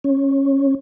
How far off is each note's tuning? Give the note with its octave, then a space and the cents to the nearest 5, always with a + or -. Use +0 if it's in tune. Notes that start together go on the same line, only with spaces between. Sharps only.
C#4 -15